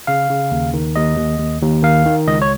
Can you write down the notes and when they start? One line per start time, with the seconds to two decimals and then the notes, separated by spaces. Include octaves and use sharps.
0.07 C#3 F5
0.30 C#3
0.51 D#2
0.74 D#3
0.96 D#2 D#5
1.17 D#2
1.39 D#2
1.61 D#2
1.83 D#3 F5
2.05 D#3
2.27 C#2 D#5
2.42 C#5